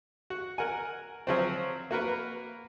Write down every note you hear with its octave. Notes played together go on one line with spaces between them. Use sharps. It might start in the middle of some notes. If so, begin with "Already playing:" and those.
F#4
A#4 F#5 G#5
F3 F#3 C4
A#3 F#4 A#4 B4